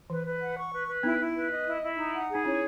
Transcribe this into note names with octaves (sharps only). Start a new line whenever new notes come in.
E3 B4
B4
F#5
C#6
B4
B4
B3 D#4 E4
E4
B4
D#5
E4
E4
D#4
F#5
G#4
D#4
C#4 E4 C#5